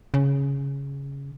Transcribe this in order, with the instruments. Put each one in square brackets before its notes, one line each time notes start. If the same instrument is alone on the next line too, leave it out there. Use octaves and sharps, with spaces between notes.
[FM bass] C#3